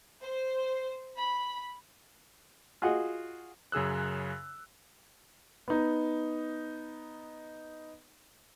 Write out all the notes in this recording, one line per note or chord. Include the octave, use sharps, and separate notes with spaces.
C5
B5
F4 F#4 G#4 D#5 F#5
F#2 C#3 G#4 E6 F#6
B3 D#4